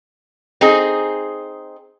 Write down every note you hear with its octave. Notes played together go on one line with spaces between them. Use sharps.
C4 D#4 G#4